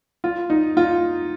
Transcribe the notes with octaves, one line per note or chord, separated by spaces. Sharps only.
F4
D#4
F4